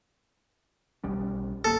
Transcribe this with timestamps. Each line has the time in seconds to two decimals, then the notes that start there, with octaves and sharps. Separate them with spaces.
1.04 B1 G3 C#4
1.65 G1 A#3 A4